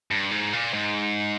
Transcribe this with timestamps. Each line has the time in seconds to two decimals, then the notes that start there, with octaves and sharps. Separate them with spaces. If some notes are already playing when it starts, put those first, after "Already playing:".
0.11 G2
0.31 G#2
0.53 A#2
0.73 G#2